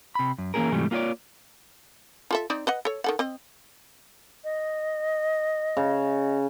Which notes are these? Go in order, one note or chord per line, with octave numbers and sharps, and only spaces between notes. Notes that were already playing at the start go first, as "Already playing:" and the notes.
C3 B5
F#2
E3 A#3 B3 C#4 G#4 A#4
G#2 C3 E3 F#3 G3 A3
A#3 F4 F#4 C#5 D5
F4 A4 E5
C4 D#4 D5
B4 D#5 F#5
A4 C#5
D#3 A4 F#5
C4 D#5
D#5
C#3